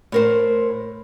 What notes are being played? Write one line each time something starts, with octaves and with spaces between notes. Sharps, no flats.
A2 A#4 C5